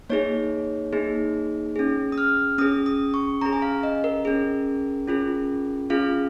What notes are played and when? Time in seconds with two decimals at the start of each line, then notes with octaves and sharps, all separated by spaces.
0.10 A#3 D#4 G#4 C#5
0.93 A#3 D#4 G#4
1.76 C#4 G#4
2.12 D#6
2.18 F6
2.58 C#4 G#4 D#6
2.86 D#6
3.14 C#6
3.41 C#4 G#4 A#5
3.53 G#5
3.62 F5
3.83 D#5
4.04 A#4
4.25 C#4 G#4
5.08 C#4 F4 G#4
5.90 C#4 F4 G#4 F5